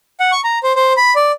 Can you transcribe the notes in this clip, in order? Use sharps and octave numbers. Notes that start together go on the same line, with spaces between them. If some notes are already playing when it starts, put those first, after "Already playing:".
F#5
C#6
A#5
C5
C5
B5
D5